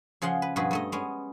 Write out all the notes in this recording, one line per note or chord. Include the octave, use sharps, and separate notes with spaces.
C#3 F3 G#4 F#5 C6
B4
G2 B2 F3 F#4 G#4 B4
G2 A3 D#5
G#3 B3 C#4